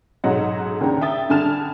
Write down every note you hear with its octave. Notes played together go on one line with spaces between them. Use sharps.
B1 G#2 F#3 D#5 F#5
D#2 C#3 D4 A#5
E5 G5 D#6 A6
G2 D3 G#5 A5 F6 E7